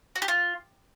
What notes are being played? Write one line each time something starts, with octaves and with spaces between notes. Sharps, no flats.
F#4
G4
F4